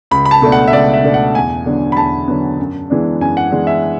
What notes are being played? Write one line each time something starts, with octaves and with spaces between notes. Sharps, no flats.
C#2 B5
B5
A5
B2 A3 D4
F#5
E5
C#2 D5
E5
B2 A3 D4
F#5
E2 G#5
D3 F#3 B3 D4
B5
E2 A5
D3 F#3 B3 D4
F#2
E3 G#3 B3 D4
F#2 G#5
F#5
E3 G#3 B3 D4
E5